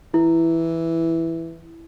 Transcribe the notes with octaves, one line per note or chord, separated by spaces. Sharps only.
E3 E4